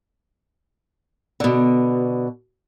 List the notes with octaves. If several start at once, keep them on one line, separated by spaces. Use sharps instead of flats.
B2 D3